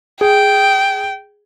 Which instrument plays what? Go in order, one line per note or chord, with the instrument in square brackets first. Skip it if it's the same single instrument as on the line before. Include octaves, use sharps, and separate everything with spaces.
[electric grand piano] G#4 [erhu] G5